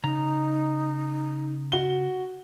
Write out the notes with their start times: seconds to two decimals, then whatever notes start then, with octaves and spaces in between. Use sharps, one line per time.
0.04 C#3 D#4 A#5
1.72 F#4 G7